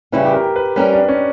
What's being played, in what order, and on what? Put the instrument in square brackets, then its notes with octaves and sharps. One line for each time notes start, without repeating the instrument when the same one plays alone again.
[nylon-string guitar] C#3 E3 G3 C#4 E4 [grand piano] B4
[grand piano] G4
A#4
B4
[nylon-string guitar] G3 C#4 G4 A#4 D5 [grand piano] B4
[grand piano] D4
C#4